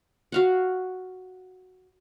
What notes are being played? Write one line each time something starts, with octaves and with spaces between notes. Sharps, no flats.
F#4 F5 F#5